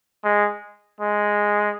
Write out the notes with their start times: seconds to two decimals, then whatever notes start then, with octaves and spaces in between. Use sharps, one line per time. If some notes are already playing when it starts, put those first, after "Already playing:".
0.24 G#3
1.01 G#3